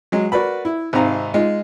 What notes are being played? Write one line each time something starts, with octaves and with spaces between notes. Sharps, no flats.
F#3 G#3
F#4 A#4 B4 D5 B5
E4
G#1 G#2 C3 F5 A#5
G#3 D#4 F4